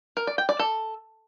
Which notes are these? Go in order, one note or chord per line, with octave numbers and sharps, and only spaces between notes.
A#4
D5
G5
D5
A4